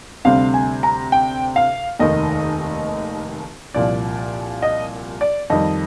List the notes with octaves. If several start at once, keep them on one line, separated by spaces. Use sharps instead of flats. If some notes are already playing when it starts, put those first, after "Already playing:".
D2 C3 G3 C4 F5
G#5
A#5
G5
F5
F1 D#2 D#3 D#5
C2 A#2 F3 D5
D#5
D5
F2 D#3 G3 D#5